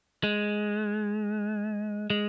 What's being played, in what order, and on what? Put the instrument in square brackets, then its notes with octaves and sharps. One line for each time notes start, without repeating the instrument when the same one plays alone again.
[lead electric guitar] G#3
G#3